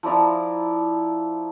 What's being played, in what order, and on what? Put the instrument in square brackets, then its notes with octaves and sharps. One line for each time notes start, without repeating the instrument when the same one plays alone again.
[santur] F3 E4 D5 A#5